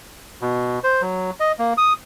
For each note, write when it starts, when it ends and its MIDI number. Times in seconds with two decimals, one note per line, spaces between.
0.42 0.79 47
0.84 1.02 72
1.02 1.31 54
1.40 1.52 75
1.59 1.73 58
1.78 1.93 87